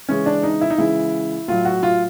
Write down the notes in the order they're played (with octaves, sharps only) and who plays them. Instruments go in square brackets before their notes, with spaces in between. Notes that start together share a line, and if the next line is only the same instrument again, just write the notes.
[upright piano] C#3 E3 G#3 C#4
D4
D#4
E4
D#4
C#3 E3 G#3 E4
A2 F#3 F4
F#4
F4